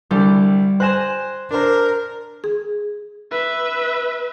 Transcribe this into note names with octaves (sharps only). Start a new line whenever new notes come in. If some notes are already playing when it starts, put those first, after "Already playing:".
C2 D3 G3
C5 G#5 C6 F#6 A#6 E7
D4 A#4 C5
G#4
B4 E5